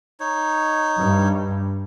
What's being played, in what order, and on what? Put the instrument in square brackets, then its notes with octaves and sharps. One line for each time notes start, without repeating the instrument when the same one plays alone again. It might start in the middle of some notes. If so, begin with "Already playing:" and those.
[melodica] D#4 C#5
[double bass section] G2